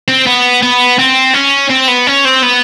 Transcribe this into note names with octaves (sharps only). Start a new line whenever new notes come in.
C4
B3
B3
C4
C#4
C4
B3
C#4
C4
B3